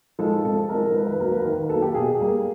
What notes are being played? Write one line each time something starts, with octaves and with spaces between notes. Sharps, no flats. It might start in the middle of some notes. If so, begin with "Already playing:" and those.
F3 G#3 A4
C3 A4
G#3 A#4
F3
D#3 B4
B4
F#3 A#3 A#4
B4
D#3 B4
F#3 A#3 A4
G4
B2 G#4
G3 A#3